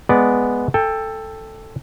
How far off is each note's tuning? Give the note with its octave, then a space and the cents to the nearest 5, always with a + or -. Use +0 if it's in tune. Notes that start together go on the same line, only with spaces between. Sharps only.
G#3 +0 B3 +0 D5 +0
A4 +5 G5 +25